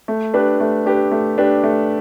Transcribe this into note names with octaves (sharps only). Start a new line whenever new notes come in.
A3
D4 G4 B4
A3
D4 G4 B4
A3
D4 G4 B4
A3